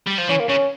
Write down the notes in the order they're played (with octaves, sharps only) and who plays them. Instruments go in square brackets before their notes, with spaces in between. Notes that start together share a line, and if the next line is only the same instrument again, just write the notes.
[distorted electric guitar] G3
F3
[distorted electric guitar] E3 [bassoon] C#4
[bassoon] A#3
[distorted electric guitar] C#3 [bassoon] C#4